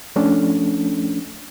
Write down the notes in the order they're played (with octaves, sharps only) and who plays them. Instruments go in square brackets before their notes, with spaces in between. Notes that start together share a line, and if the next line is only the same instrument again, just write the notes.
[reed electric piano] F3 A3 C#4 D4